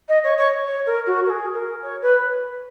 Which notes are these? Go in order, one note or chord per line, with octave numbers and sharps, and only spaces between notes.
D#5
C#5
C#5
C#5
A#4
F#4
A#4
G#4
A#4
C#5
B4